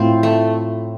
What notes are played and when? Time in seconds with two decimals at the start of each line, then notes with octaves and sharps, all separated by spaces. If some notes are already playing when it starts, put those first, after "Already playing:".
Already playing: A2 C4 F4
0.23 A3